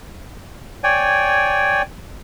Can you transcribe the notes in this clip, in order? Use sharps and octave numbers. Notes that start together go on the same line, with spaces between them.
C#5 D5 G5 G#5